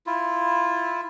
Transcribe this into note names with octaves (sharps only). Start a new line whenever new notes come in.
E4 F4